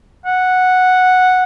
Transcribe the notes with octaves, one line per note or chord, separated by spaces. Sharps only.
F#5